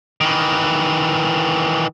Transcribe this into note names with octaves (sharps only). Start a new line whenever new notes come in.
D#3 E3